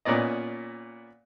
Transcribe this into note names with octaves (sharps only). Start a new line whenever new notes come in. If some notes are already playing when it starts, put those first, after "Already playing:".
A#2 B3 C#4 D5 D#5